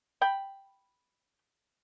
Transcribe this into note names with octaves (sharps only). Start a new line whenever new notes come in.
G5 B5